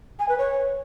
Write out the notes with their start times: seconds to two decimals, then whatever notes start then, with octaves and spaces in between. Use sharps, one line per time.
0.19 G#5
0.29 B4
0.38 C#5